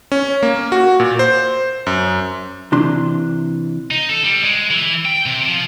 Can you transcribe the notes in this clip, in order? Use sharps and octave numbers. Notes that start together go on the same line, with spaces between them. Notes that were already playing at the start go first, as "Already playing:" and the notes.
C#4
A#3
F#4
A#2
C5
F#2
C3 E3 D4 C6
D#4
A4
G3
G#3
E3
G5
C3
F3